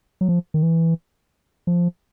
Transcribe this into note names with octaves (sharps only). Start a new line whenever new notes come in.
F#3
F3
D#3
E3
F3